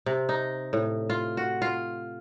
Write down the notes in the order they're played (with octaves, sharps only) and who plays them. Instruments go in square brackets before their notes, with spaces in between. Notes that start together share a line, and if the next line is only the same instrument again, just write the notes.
[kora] C3
D#4
A2
F4
F#4
F4